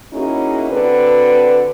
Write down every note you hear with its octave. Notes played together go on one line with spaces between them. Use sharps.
A#3 C#4 D#4 E4 F#4 G#4
D3 C4 F#4 B4